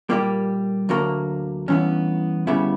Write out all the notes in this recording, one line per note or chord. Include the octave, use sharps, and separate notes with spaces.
A#2 G3 A#3 G4
D2 D3 F#3 A#3
G2 E3 B3 C#4
D2 C#3 G3 B3 E4